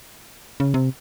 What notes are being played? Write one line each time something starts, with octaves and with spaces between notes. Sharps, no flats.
C#3
C3